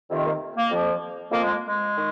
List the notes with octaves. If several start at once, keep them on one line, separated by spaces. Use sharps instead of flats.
F2 C3 D#3
A#3
A#3
F2 F3
F2 F3 A#3
G#3
G#3
D#3